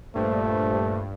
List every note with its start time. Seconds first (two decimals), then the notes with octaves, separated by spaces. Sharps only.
0.15 G2 A#2 A3 C5